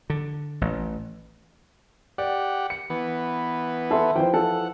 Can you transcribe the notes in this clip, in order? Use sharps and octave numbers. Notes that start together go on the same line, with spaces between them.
D3
A1
G4 D5 F#5
C#7
E3 B3
A4 E5 C6
E3 F3 C5 G5
A4 F#5